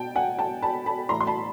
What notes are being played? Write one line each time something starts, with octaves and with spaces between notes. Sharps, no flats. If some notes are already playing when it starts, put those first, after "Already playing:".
Already playing: B2 G5 A5
F#5 G#5
G5 A5
A5 B5
A5 B5
A2 E3 A#5 C6
C6
A5 B5